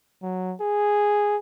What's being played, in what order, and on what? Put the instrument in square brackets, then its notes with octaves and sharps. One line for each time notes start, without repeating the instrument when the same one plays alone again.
[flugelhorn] F#3
G#4